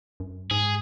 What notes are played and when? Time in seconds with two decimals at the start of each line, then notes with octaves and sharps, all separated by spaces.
0.20 F#2
0.51 G#2 G#4